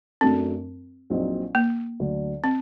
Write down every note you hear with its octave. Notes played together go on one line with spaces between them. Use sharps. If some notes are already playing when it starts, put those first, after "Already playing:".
F#2 F#3 A3 C4 D4 A4
A#1 A#2 F#3 C4 D#4
A#3
D2 D3 F#3
C4